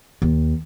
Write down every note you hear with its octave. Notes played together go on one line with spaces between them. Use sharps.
D#2